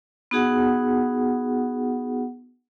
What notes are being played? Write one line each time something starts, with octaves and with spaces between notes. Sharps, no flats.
B3 D#4 F#4 G#4 F#5